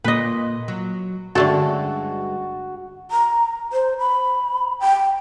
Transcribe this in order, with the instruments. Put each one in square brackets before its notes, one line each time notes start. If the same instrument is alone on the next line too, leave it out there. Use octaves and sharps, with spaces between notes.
[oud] A#2 [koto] B4 D#5
[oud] F#3
[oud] G2 G#3 C#4 [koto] D3 A3 A4 [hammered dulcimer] F#4
[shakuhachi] A#5
C5
B5
G5